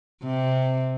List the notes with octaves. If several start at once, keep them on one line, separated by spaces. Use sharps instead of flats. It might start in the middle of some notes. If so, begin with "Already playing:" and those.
C3